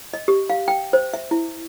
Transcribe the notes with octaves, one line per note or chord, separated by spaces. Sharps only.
D#5
G4
F5
G5
C5
E5
E4